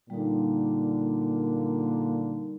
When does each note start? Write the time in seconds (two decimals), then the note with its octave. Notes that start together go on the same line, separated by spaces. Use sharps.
0.10 A#2 D3 G3 A#3 D#4